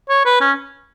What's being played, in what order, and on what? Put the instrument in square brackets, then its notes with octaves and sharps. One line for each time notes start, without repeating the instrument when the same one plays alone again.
[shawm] C#5
B4
C#4